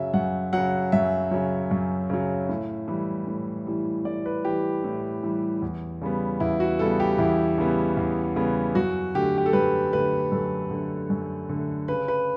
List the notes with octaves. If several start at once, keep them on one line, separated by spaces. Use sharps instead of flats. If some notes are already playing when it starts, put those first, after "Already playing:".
Already playing: F#2 C#3 F#3 E5
F#2 F#5
C#3 F#3 F#5
F#2 E5
C#3 F#3
F#2
C#3 F#3
A2
E3 G3
A2
E3 G3
A2 D5
B4
E3 G3 G4
A2
E3 G3
E2
C#3 G3 B3
E2 E4
F#4
C#3 G3 B3 A4
G4
E2 E4
C#3 G3 B3
E2
C#3 G3 B3
F#2 F#4
D3 A3 G4
G4
A4
F#2 B4
D3 A3 B4
F#2 A4
D3 A3
F#2
D3 A3
C#3 B4
B4